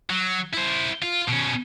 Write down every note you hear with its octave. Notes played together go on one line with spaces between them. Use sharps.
F#3
E4 C5
F4
B2 C#4